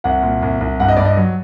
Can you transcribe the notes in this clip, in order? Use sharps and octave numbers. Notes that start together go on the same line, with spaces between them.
C2 F#5
A#2
C2
C2
G2 F#5
D#5
G2 D5
D#5
F#3